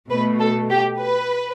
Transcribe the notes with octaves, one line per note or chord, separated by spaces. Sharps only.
B2 A3 B4
A4
G4
B4